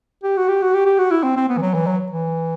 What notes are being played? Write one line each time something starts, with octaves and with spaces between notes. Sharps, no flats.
G4
F#4
G4
F#4
G4
G4
F#4
E4
C4
C4
B3
E3
F#3
E3
F#3
E3